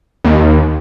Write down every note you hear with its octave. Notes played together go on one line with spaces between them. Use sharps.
D#2